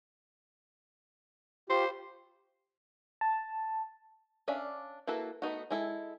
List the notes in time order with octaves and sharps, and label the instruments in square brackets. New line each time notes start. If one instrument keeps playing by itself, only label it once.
[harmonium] F4 G4 [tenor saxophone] C5
[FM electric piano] A5
[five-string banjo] C#4 D4 D5 E5 F5
A#3 E4 F#4 A4 B4
A3 B3 D#4 F#4
G#3 E4 A4